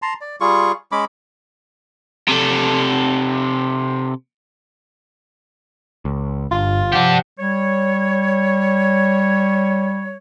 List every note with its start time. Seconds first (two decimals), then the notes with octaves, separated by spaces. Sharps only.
0.02 A5 A#5 C6
0.21 D5
0.41 G3 F4 G#4 C#6
0.92 G#3 C#4 B5 D6
2.29 C3 A4
6.05 C#2
6.51 G1 G2 F4
6.92 C3 F3 D4 G4 F#5
7.39 G3 C#5